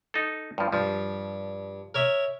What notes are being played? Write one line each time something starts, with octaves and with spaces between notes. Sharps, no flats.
D#4 A4
G2 F3
G2 F3
A#4 C#5 E5